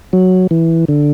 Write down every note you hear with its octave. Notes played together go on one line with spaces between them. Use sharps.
F#3
E3
D3